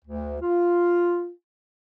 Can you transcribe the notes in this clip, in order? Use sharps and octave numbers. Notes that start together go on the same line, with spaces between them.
D2
F4